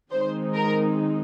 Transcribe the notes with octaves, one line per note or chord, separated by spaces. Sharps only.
D#3 G#3 C4 D#4 C5
A#4